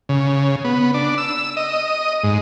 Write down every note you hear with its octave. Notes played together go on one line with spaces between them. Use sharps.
C#3
B3
D4
E6
D#5
G#2